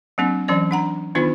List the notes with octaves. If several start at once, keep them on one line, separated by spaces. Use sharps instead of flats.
F#3 A#3 C4 D4
E3 F#3 C#4 D5
D4 F#5 A#5
D#3 B3 D4 D#4 F4